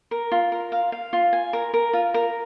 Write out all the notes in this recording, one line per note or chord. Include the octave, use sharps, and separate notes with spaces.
A#4
F4
A#4
F5
F5
F4
G#5
A#4
A#4
F4
A#4